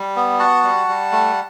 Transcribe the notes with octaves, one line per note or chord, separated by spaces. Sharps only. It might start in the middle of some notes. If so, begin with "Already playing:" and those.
Already playing: G3
B3
F#4 F#5 A5
G3
G3
A3